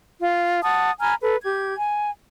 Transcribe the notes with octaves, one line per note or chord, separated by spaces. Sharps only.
F4
F#5 A5 D#6
G#5 A#5 B5 F6
A4 B4
G4 G#6
G#5